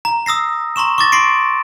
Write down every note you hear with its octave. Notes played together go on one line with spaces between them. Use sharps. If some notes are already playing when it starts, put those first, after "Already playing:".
A#5
D#6 E6 A#6 C7
A#5 C6 C#6 E7
C#6 D6 A6 A#6
C6 A#6 C7 D7